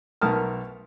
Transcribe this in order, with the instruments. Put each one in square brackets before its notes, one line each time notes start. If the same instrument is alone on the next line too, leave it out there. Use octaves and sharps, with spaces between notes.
[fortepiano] B1 A3 A#4 A5 D#6 F6